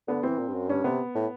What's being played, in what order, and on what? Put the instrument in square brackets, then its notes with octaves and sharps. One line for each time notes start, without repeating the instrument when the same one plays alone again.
[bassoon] D3 [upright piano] B3
[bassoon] E3 [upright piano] C4
[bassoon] A#2
G2
F#2
[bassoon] G2 [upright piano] C#4
[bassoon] C3 [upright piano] B3
[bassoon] A2